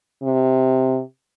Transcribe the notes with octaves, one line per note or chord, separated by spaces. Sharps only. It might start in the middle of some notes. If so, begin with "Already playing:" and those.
C3